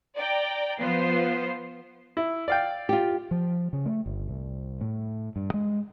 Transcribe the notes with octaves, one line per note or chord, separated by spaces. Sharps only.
D5 G5 A#5
F3 B3 F4 C5 C7
E4
D5 F5 G5
F4 G4
F3
C#3
A3
G1
C2
A2
G2
G#3